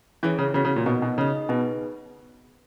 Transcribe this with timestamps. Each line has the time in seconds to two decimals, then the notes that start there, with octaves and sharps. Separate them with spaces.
0.23 E3 C#4 E4 G#4 C#5
0.38 C#3
0.54 C#3 B3 F#4 C#5
0.65 C#3
0.76 A#2
0.86 B2 B3 D#4 F#4 A#4 D#5
1.02 B2
1.18 C#3 D#4 G#4 D#5
1.49 B2 D#4 G#4 B4